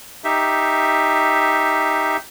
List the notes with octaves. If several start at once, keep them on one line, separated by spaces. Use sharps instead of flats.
D#4 G4 E5